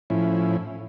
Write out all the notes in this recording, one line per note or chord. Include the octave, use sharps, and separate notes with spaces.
A2 F3 C#4 E4